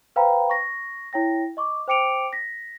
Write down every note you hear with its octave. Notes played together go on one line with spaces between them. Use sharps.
B4 C5 F5 G5 A#5 B5
C#6 A#6
E4 C#5 G5 A#6
D#5 C#6 D6
C5 G5 D6 C#7 D7 F7
A#6 B6